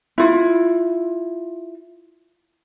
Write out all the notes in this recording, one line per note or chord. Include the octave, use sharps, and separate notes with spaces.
E4 F4